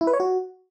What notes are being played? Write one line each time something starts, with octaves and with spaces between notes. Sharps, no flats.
E4
B4
C#5
F#4